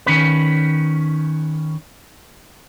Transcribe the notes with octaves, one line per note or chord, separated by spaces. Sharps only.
D#3 C#4 B4